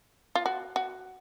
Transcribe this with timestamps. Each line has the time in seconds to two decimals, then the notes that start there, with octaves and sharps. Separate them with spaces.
0.35 F4
0.46 F#4
0.76 F#4